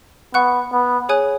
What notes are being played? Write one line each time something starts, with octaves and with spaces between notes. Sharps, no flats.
B3 F#5 C#6 F#6
B3
G#4 C#5 G#5 D#6 F#6